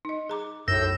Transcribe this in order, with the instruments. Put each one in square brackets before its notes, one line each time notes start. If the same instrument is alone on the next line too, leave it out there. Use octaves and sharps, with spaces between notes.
[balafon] D#4 D#5
G#4 A#5 D6
[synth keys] B1 F#2 [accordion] A2 E6 G6 [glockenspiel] A#6